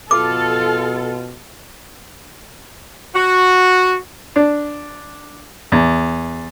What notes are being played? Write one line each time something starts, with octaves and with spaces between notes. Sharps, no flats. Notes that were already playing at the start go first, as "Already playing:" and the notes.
B2 F4 A4 D6
F#4
D4
E2